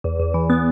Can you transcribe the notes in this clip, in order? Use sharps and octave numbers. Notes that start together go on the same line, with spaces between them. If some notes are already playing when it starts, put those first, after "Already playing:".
E2
E2
E3
B3